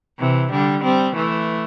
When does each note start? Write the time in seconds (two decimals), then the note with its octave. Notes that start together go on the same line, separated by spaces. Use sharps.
0.18 C3 E3
0.51 D3 G3
0.84 G3 C4
1.16 E3 A3